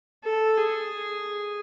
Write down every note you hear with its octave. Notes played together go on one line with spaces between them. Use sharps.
A4
G#4